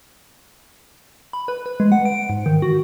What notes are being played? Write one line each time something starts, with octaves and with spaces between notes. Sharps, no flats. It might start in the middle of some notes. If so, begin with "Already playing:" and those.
B5
B4
B4
G#3
F#5
D7
G#2
D#3
F#4